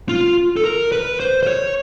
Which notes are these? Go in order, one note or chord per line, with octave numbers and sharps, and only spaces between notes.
F4
A4
A#4
B4
C5
C5
C#5